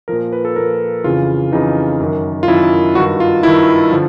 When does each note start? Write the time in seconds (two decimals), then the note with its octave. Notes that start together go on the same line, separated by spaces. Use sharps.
0.08 A#2 F3 A#4
0.33 B4
0.45 A4
0.56 A#2 F3 A#4
1.04 F2 C#3 E3 F4
1.52 F2 C#3 E3 D#4
2.00 F#2 D#3
2.43 F4
2.48 F#2 D#3 E4
2.95 G2 D#3 F#4
3.20 F4
3.43 G2 D#3 E4
3.91 D3 F3